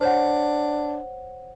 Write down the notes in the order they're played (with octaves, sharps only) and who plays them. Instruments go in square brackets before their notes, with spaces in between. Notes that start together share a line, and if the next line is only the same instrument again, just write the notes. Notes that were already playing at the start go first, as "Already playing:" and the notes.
[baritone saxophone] D4 [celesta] C5 C#5 F#5